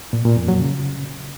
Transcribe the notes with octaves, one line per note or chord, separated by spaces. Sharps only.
A#2
A#2
F2
F#3
C#3